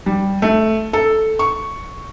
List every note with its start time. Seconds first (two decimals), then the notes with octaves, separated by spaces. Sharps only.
0.06 G3
0.42 A3
0.93 A4
1.39 C#6